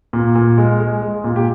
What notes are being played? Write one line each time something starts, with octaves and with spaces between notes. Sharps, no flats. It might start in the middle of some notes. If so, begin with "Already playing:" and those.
A#2
A#2
G#3
G#3
G#3
A#2
G4